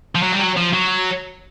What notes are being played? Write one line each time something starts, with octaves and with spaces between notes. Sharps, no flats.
F3
F#3
G3
F#3
F3
F#3